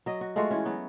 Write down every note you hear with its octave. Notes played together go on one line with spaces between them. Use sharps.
F#3 D#5
F#4
G#3 A3 F4 F#4
E3 C#4
F#3 B3